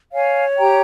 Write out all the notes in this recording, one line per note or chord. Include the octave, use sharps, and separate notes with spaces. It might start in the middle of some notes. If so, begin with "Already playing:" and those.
C#5 F5 G#5
G4 G5 A#5